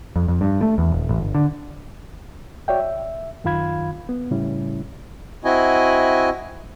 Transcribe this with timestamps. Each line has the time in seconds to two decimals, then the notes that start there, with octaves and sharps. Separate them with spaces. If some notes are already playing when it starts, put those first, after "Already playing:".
0.16 F2
0.28 F2
0.41 G2
0.62 A3
0.78 E2
0.92 D#1
1.09 A1
1.21 G1
1.35 D3
2.68 F#4 C#5 D5 E5 G5
2.79 E5
3.44 F#2 D#3 F4 F5 B5 G#6
4.09 B3
4.31 A2 C#3 G3 C#4 E4
5.44 C4 E4 F#4 D#5 G#5